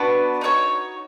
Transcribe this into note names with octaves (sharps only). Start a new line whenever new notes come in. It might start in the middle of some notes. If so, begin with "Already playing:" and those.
Already playing: B3 D4 F#4 B4
D#4 F#4 A4 C#5